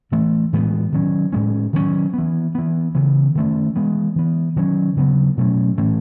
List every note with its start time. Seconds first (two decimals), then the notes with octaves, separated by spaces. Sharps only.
0.12 A2 E3 A3
0.53 A2 E3 G#3 B3
0.92 D#3 F#3 C#4
1.33 A2 G#3 C#4
1.73 D#3 F#3 A3 C#4
2.14 E3 B3
2.55 E3 B3
2.95 C#3 E3 B3
3.35 D#3 A3 C#4
3.76 E3 G#3 B3
4.16 E3 B3
4.56 D#3 F#3 C#4
4.96 C#3 F#3 B3
5.37 B2 F#3 A3 C#4
5.77 A2 E3 A3 C#4